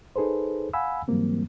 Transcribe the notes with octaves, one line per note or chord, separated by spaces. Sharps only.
D#4 G#4 A4 B4 C5
F5 F#5 G#5 B5 E6
G#2 E3 F#3 G3 A#3 C4